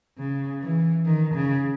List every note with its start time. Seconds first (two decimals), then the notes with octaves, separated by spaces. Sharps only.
0.18 C#3
0.62 E3
1.06 D#3
1.35 C#3